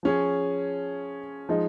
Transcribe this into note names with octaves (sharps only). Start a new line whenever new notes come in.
F3 C#4 G#4 C#5
F3 G#3 D#4